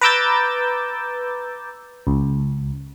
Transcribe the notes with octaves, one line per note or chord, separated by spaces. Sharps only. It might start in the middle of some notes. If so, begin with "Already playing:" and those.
B4 A#5 D6 E6 G6 A6
C#2